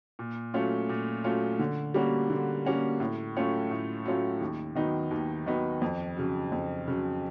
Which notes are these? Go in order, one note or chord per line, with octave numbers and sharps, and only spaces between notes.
A#2
F#3 A3 C#4 F4
A#2
F#3 A3 C#4 F4
D3
G3 A#3 C#4 F#4
D3
G3 A#3 C#4 F#4
A2
F#3 A3 C#4 F4
A2
F#3 A3 C#4 F4
D#2
D#3 F#3 B3 D#4
D#2
D#3 F#3 B3 D#4
F2
C#3 F#3
F2
C#3 F#3